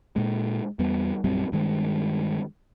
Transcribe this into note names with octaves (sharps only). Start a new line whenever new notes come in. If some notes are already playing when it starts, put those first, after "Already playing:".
A#2 G#3
E2 G3 B3
A#1 F#2 G3 C4
G2 D#3 G#3